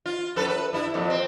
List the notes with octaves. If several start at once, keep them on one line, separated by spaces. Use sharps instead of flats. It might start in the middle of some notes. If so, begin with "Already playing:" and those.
F4
F#2 A4 B4
B4
G2 E4
F2 A#2
C4